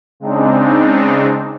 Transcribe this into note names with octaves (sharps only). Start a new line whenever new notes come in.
C#3 G#3 C4 D4 D#4